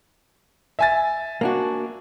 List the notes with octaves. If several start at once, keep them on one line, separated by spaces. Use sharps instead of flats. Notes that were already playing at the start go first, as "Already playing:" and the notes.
E5 G#5 A6
A#3 D4 F#4